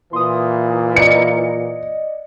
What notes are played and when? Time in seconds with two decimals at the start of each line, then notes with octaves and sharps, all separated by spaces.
0.13 A#2 E3 C6 D#6
0.96 D5 D#5 C#7